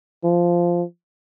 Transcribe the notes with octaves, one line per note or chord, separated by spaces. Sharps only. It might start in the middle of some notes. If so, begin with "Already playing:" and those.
F3